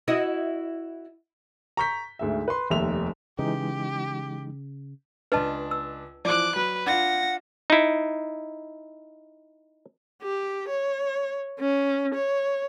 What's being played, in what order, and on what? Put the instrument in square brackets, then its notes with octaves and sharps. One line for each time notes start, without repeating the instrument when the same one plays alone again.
[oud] E4 F#4 D#5
[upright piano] A#5 C#6 G6 B6
D2 G#2 E5
B4 C6
F1 D#2 E5 F7
[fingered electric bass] C#3 [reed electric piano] E3 G#3 D#4 [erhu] G4
[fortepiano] C#2 D4 [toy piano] B4 D#5 A5
[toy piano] E6
[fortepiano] E3 F3 [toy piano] D5 [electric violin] D6 F#6
[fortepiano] F#3 [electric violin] B4
[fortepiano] D4 F4 [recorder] F#5 [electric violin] A#6
[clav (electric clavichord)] D#4 E4
[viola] G4
C#5
C#4
C#5